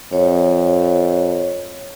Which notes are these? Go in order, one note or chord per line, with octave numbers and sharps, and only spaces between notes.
F2 C#5